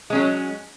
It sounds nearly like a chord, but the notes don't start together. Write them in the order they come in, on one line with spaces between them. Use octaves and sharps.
G#3 C#4 F#3